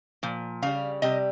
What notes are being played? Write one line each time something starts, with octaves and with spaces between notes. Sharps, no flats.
A#2 F3
C#3 G3 F5
C3 G3 D#5